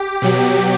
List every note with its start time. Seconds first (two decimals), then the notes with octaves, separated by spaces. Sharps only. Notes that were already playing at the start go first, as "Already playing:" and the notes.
Already playing: G4
0.22 B2 F#3